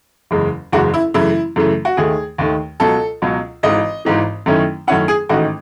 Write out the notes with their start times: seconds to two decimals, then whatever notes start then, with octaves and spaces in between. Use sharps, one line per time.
0.31 F#1 E2 C#3 G#3
0.72 F#1 E2 C#3 G#3 F#4
0.94 E4
1.14 F#2 C#3 E3 A3 E4
1.56 F#2 C#3 E3 A3
1.85 F#4
1.97 D#2 D#3 A3 G#4
2.38 D#2 D#3 A3
2.80 C#2 B2 F#3 A4
3.22 C#2 B2 F#3
3.63 G#1 G#2 E3 D#5
4.05 G#1 G#2 E3
4.46 F#2 D#3 A3 C#4 E4
4.87 F#2 D#3 A3 C#4 E4 F#5
5.08 G#4
5.29 A1 G#2 D#3 A3 D#4 F#4